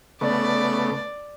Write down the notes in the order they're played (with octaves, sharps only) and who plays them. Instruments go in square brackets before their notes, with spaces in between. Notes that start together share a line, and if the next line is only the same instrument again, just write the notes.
[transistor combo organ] C#3 A3 B3 [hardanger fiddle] D5